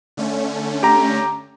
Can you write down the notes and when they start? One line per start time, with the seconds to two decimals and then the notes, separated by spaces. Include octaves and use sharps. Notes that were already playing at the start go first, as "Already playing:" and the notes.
0.17 D3 A3 C#4
0.83 G4 A#5